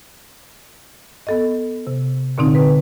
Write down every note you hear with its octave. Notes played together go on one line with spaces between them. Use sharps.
B3 A4 D#5
C3
A#2 D3 C4 D#4
B4